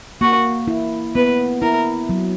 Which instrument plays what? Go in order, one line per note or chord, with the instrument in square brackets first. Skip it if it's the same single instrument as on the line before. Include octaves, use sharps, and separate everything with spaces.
[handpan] A#3 [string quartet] F#4
[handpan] E4
[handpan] B3 [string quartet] B4
[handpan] E4 [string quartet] A#4
[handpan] F#3